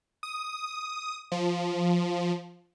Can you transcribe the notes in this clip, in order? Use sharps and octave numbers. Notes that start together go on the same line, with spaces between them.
D#6
F3